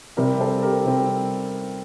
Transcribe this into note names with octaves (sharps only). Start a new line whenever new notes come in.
C3 G3 C4 G4 A#4
A4 C5
G4 A#4
C3 G3 C4